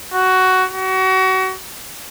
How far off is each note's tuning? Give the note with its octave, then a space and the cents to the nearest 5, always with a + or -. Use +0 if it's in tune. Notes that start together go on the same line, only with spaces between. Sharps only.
F#4 +10
F#4 +30